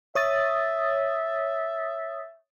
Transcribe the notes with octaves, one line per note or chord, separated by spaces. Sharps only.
C#5 E5 D#6 A6